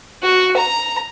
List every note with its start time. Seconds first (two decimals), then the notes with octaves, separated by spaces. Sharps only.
0.23 F#4
0.57 A#5